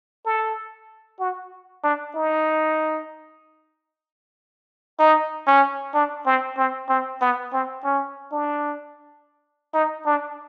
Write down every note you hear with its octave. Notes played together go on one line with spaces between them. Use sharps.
A4
F#4
D4
D#4
D#4
C#4
D4
C4
C4
C4
B3
C4
C#4
D4
D#4
D4